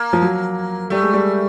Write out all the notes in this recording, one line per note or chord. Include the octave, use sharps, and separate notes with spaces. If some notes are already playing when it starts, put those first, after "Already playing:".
Already playing: A#3
F3
F#3
G3 A3
G#3
G3